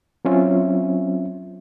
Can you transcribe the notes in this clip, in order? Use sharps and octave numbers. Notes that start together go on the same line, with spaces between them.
F#3 C4 C#4 F4 E5